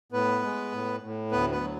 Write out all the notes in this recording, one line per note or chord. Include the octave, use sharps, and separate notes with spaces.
A2 B3 B4
G#3
A2
A2
D2 B3 B4
B3 B4
F#3